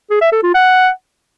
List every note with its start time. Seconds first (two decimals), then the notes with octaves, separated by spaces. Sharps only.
0.10 G#4
0.21 E5
0.32 A4
0.43 F4
0.54 F#5